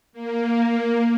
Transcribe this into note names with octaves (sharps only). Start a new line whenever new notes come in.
A#3